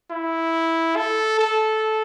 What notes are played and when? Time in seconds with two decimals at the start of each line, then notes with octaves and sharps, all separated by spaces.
0.11 E4
0.96 A4
1.39 A4